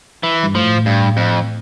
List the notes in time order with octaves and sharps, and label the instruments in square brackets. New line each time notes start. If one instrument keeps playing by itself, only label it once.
[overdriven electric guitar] E3
[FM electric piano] G2
[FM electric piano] A2 [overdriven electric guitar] F3
[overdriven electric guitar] G2
F2